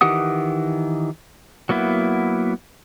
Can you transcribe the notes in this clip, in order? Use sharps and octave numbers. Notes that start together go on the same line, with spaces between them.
D#3 E3 G4 F#5 D#6
F#3 A#3 B3 E4